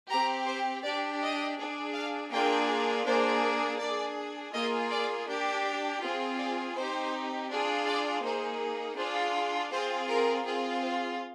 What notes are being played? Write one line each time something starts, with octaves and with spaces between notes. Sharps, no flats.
C4 G4 A#5
C5
D4 G4 D5
D#5
D4 G#4
F5
A#3 D4 F4 G#4 G5
A#3 D4 G#4 C5
D4 G#4 D5
A#3 F4 G#4 D#5
D5
D4 G4
C4 F4 G#4
D5
C4 D#4 G4 C5
D4 F4 G#4
D5
A#3 D#4 G#4 C5
D4 F4 G#4 C5
C4 F4 G#4 C5
A#4
C4 F4 G#4
C5